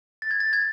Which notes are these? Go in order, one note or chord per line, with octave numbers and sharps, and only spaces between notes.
A6
G#6
A6
G#6